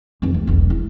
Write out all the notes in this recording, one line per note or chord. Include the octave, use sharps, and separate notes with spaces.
F1 E2
D2
E1 B1
E4